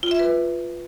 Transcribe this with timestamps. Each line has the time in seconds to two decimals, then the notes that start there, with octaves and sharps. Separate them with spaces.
0.03 F4
0.11 E5
0.19 B4